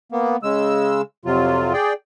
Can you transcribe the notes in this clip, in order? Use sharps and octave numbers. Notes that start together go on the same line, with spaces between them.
A#3 B3
C#3 G#3 E6
F2 C3 F#3 F4
G#4 D5 G5